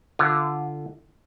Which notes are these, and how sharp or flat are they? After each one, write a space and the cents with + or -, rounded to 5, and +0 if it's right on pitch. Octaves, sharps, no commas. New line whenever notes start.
D3 +0 F4 -20